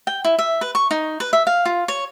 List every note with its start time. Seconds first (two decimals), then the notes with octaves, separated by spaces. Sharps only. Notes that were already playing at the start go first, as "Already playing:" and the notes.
0.07 G5
0.24 E4
0.39 E5
0.61 B4
0.75 C#6
0.91 D#4
1.20 B4
1.33 E5
1.47 F5
1.65 F4
1.88 C#5